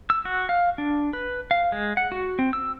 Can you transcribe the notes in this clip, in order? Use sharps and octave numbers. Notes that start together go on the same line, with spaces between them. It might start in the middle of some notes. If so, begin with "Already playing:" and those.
E6
F#4
F5
D4
B4
F5
G#3
F#5
F#4
C4
E6